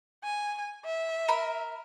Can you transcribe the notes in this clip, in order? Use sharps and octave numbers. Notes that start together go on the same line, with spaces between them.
G#5
E5
A#4 B5